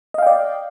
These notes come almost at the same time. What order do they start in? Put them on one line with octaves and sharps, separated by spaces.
D#5 F5 G5 D5